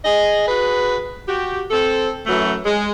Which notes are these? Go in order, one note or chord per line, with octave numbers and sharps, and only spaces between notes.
G#4 D#5
F#4 G#4 B4
F#4 G4
C4 A4
F#2 E3 F#3 A3
G#3